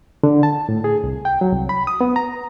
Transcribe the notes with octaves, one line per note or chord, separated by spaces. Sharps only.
D3
A5
A2
G#4
C2
G5
F#3
C2
B5
D#6
B3
A#5